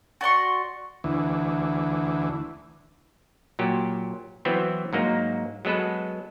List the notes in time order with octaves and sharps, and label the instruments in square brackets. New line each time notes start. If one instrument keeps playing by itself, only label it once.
[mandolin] F#4 D5 C6 C#6
[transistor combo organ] D2 E3
[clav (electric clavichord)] A#2 F#3 G4
E3 F#3 B3 C4
G#2 F#3 A#3 D#4
F#3 G#3 B3 A4 B4